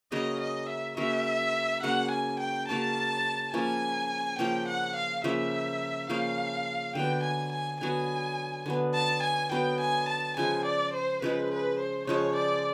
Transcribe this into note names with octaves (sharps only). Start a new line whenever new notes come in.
C#3 F#3 A#3 C#4 D#5
D#5
E5
C#3 F#3 A#3 C#4 E5
C#3 F#3 A#3 C#4 F#5
G#5
G5
C#3 F#3 A#3 C#4 A5
C#3 F3 A#3 C#4 G#5
C#3 F3 A#3 C#4 G5
F#5
F5
C#3 F3 A#3 C#4 E5
C#3 F3 A#3 C#4 F5
D3 F#3 B3 G5
G#5
G#5
D3 F#3 B3 G#5
D3 F#3 B3
A5
G#5
D3 F#3 B3 G5
G#5
A5
C#3 F3 G#3 G#5
D5
C5
C#3 F3 G#3 B4
B4
C5
C#3 F3 G#3 C#5
D5